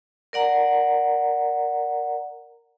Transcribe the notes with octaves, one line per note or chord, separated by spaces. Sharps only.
A#4 D5 F#5 A#5